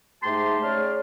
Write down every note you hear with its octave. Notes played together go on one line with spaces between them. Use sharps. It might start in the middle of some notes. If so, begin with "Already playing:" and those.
G#2 A3 D#4 G4 A5 C6
C#3 C#5 D5 F6